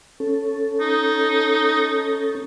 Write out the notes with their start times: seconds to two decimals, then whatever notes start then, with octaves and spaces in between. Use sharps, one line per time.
0.20 C#4 A4
0.80 D#4